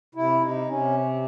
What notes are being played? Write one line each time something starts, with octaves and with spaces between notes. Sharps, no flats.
C3 E4
C3 D#4
C3 C#4